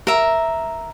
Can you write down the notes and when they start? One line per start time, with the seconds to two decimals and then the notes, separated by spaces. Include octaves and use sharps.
0.07 A#4 E5